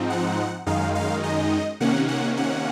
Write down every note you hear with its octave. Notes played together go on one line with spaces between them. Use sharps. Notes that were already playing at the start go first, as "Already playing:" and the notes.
Already playing: G#2 F3 C4 D#4
F#5
F#2 D#3 G#3 D#4 F5
F5
D#5
C3 D#3 A#3 C#4 F#5
F#5
F#5